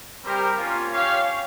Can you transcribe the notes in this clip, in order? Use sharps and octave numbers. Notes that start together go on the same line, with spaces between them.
G3 C4 G4 A#4
A#3 C#4 F4
C#4 G4 C#5 F5